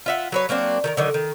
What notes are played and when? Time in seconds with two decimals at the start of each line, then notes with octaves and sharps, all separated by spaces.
0.06 F4 E5 F#5
0.32 F#3 B4 C#5
0.49 F#3 A#3 C4 D4
0.84 D#3 A4 A#4
0.97 D3 D#3 F#3
1.14 D#3